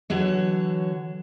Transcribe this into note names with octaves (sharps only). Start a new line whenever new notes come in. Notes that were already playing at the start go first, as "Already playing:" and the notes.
D3 E3 F#3 C#5